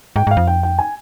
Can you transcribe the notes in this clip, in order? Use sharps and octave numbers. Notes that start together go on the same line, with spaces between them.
G#2 G5
G#2 F5
F2
G5
G5
G#5